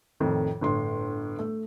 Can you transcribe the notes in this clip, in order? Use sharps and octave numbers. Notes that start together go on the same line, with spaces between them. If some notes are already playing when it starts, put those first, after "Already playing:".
F2 A2 D#3
G1 A2 C6
A3